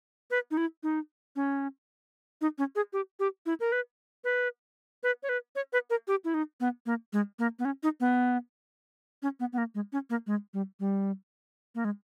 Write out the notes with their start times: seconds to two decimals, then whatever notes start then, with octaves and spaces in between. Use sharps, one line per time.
0.31 B4
0.51 D#4
0.57 E4
0.83 D#4
1.36 C#4
2.41 D#4
2.58 C#4
2.76 G#4
2.93 G4
3.20 G4
3.46 E4
3.60 A#4
3.72 B4
4.24 B4
5.03 B4
5.23 C#5
5.29 B4
5.56 C#5
5.73 B4
5.90 A#4
6.08 G4
6.25 E4
6.34 D#4
6.60 B3
6.86 A#3
7.13 G#3
7.39 A#3
7.59 B3
7.65 C#4
7.83 D#4
8.00 B3
9.23 C#4
9.40 B3
9.53 B3
9.58 A#3
9.75 G#3
9.93 C#4
10.10 A#3
10.27 G#3
10.54 G3
10.80 G3
11.75 A#3
11.85 G#3